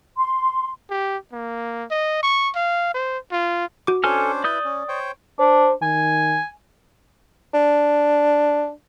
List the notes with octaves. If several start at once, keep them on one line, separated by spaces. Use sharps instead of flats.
C6
G4
A#3
D#5
C#6
F5
C5
F4
F#4 D6
C#4 D4 A4 C5 G#5 F6
E4 B4 D5 D#6 G6
C#4
C5 C#5 G5
D4 C5
D#3 G#5
D4